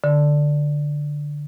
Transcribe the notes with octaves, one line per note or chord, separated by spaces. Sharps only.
D3